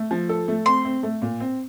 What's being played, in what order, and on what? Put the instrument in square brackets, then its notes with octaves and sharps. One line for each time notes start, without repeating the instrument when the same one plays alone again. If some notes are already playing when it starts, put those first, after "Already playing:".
Already playing: [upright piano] A3
F3
A4
A3
[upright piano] C4 [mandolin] C6
[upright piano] C4
A3
A#2
C4